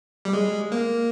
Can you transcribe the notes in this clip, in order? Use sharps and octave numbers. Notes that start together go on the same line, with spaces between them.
G3
G#3
A#3